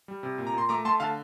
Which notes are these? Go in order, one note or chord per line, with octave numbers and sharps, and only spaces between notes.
G3
C3
A#2
A#5
A#2 C6
A3 A#5 D6
A3 A5 C6
D3 F5 A5